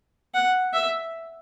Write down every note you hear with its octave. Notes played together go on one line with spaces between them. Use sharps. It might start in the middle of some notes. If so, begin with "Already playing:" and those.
F#5
E5